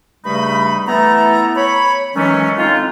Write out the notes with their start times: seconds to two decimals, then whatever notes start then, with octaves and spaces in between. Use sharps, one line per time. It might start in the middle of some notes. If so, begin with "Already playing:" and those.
0.24 G2 C#3 G3 A3 D#4 B5
0.86 E3 A3 B3 E4 A4 A#5
1.55 C#5 B5
2.14 D#3 E3 F#3 G#3 A3 C#4
2.56 A2 G#3 C4 D#4 F4